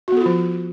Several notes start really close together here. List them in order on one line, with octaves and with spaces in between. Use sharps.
F#4 B3 A4 F4 F3